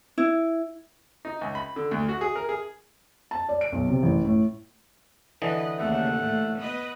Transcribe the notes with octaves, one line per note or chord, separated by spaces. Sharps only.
E4
D#4
C#2
B5
D3
D2
F#4
G#4
A#4
G#4
A5
D5
D7
B1
C3
A1
A2
D3 E3 B4 D#5
D#2 C#3 A3 F#5
A2
B3 B4 D#5